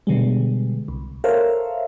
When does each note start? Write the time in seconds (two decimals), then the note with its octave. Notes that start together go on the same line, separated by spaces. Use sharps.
0.07 B2 D3 G3 G#3
0.88 C2
1.24 A4 A#4 C5 C#5 E5 F5